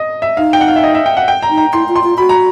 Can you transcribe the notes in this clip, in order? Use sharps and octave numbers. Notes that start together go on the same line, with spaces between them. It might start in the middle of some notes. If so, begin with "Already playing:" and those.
Already playing: D#5
E5
D#4 F5
G5
F#5
F5
E5
D#5
E5
G5
F#5
G5
A#5
D#4
A#5
E4 C6
F4
C6
F4
F#4 B5
A#5